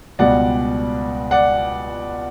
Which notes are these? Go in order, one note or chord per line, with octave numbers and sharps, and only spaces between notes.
C#2 B2 G3 D5 F#5
D5 F#5